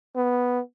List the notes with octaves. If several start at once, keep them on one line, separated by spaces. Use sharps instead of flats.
B3